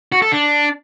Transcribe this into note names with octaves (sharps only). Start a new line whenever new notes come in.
F#4
A4
D4